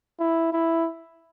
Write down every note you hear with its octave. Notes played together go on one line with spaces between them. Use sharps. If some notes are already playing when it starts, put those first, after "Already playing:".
E4
E4